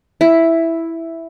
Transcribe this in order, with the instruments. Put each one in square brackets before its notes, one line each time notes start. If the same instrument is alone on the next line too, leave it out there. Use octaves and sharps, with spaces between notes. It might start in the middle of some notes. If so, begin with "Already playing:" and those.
[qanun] E4